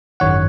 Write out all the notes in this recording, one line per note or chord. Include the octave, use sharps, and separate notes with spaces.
G#1 F#2 D#3 C#5 F#5